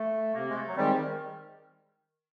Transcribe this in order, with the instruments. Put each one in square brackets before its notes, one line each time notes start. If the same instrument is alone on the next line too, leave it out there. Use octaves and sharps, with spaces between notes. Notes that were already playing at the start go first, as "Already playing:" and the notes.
Already playing: [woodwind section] A3
[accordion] C3 [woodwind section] A#3
[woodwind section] G#3
A3
F#3
[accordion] D#3 G#3 C4 [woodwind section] G3
[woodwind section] D#3